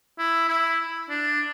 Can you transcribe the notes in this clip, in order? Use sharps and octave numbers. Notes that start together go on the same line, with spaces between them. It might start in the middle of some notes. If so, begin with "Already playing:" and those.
E4
E4
D4